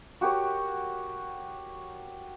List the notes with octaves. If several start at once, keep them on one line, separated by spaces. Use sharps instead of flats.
F#4 G4 A#4 C#5